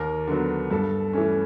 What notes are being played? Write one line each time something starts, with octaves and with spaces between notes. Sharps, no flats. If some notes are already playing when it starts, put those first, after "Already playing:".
Already playing: D#2 A#4
D3 F#3 B3
G2 A4
E3 A3 C#4